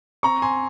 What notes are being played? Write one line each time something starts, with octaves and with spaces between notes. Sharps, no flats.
C4 A#5 C#6
G#5 C6